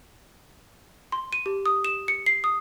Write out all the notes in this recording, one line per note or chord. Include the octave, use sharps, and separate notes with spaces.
C6
D#7
G4
D#6
E7
C#7
C7
D#6